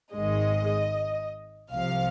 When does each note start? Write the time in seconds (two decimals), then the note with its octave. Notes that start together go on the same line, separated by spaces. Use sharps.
0.13 G#1 G#2 D#3 G#3 D#5
1.72 C2 C3 F3 F5